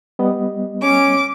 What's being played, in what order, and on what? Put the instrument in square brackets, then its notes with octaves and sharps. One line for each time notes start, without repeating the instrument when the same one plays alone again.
[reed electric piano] G3 B3 D#5
[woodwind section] C#4 [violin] D6